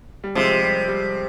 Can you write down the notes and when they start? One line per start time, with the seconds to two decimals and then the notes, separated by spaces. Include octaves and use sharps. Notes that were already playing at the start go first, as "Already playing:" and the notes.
0.24 G3
0.35 C3 F3 G#3
0.62 G3
0.88 G3